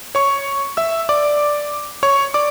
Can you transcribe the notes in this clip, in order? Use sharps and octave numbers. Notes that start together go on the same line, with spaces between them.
C#5 C#6
E5 E6
D5 D6
C#5 C#6
D5 D6